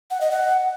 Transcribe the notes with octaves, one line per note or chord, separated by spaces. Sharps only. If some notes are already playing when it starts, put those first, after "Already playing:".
F#5
D#5
F#5